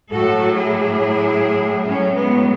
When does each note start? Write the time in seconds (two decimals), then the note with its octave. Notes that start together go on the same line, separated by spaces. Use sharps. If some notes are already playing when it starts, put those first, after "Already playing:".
0.10 A2 F#3 F#4 A4
0.55 E4 G#4
1.85 A2 F#3 A3 C#4
2.14 G#3 B3